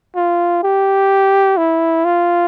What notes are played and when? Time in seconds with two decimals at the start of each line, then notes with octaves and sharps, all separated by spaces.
0.16 F4
0.63 G4
1.57 E4
2.05 F4